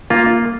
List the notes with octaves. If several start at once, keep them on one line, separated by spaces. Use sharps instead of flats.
A#3 F4